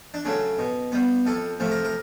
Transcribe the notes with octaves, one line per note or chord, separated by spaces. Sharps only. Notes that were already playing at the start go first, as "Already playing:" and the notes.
D4
C#3 F#3 A3
B2
G3 B3
F2 A4
C3 F3 A3
A#4
A#4